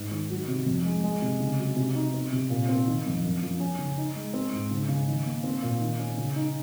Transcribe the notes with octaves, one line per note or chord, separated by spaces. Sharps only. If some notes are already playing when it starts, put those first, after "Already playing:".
Already playing: G#2
D#3
F#3
C3
F2
G#3
G#3
C3
C#3
F#3
C3
D#4
C4
C3
A#2
C4
D#3
F2
F#2
F3
C#4
C#3
D#4
G#3
C4
G#2
C#3
C#3
D#3
A#3
C4
A#2
D#3
C#4
C#3
D#4